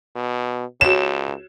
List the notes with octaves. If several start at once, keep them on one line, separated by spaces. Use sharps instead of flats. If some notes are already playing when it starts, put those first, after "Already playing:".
B2
C#2 F#4 C#5 E7